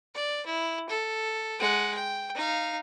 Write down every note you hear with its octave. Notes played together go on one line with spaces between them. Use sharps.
D5
E4
A4
G#3 F#5
G5
D#4 F5